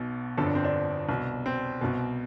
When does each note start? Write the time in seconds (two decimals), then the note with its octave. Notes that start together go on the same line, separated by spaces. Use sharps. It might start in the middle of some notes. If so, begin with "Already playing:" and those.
Already playing: B1 B2
0.37 G1 F2 D3 A4
0.46 D4
0.55 C4
0.64 D4
1.09 C2 B2
1.46 C4
1.81 C2 B2